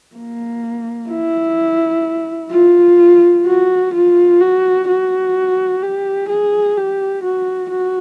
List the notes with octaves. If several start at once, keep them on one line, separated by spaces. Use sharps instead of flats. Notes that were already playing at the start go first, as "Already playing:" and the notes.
A#3
E4
F4
F#4
F4
F#4
F#4
G4
G#4
G4
F#4
F#4